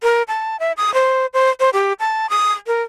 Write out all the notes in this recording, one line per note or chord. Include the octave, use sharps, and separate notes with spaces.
A#4
A5
E5
D#6
C5
C5
C5
G4
A5
D#6
A#4